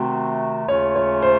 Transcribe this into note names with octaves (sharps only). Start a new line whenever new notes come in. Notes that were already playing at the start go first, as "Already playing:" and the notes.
Already playing: C3 D#3 A3 C4 F#4
D#2 C#3 A3 C#4 F4 C#5
C#5
C5